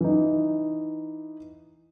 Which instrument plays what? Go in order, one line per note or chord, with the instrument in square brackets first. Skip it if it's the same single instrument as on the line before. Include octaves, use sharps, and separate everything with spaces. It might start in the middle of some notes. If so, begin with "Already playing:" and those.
[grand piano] E3 D#4